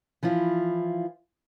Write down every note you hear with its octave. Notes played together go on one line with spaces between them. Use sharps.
E3 F3 E4 F4